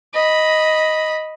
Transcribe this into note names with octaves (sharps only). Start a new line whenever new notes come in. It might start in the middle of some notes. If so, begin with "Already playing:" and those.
D#5 B5